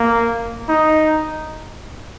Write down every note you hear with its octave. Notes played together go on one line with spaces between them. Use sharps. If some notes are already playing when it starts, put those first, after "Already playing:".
Already playing: A#3
D#4